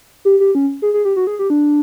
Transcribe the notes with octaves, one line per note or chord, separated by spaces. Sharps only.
G4
G4
C#4
G#4
G#4
G4
F#4
G#4
G4
D4